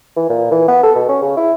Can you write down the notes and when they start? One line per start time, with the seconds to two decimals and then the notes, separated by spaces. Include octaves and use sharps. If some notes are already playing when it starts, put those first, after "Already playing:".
0.16 E3
0.30 A#2
0.51 E3
0.68 B3
0.83 A4
0.95 B2
1.09 C#4
1.22 C#3
1.37 E4